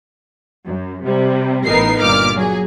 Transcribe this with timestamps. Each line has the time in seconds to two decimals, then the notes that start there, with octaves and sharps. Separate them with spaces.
0.65 F#2
1.05 C3 G3
1.65 A1 A2 B3 D#4 A#4 C7
2.01 G1 A#2 D6 F6
2.34 F#3 G#4